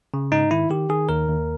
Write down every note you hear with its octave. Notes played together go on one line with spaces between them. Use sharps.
C#3
G#2 D#4
D#3 E4
D#3 G4
D#3 G#4
D#2 A#4
D#2